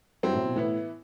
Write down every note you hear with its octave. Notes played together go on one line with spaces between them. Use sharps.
G2 F#3 C4 E4
A2
B2
A2 E3 B3 E4